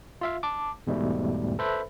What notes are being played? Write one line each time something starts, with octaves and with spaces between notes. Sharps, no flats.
F4 E5 F5
A5 D6
E2 G#2 B2 G3 A3
A4 B4 C5 E5 B5